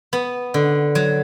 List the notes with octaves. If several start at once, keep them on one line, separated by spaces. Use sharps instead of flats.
B3
D3
F#3